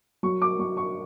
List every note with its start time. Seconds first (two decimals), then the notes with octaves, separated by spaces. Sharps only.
0.23 F#3 C#6
0.42 D6
0.59 F#3 C#6
0.77 C#6